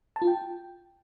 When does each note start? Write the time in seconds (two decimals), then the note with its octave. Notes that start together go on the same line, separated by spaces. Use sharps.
0.16 A5
0.22 F4
0.27 G5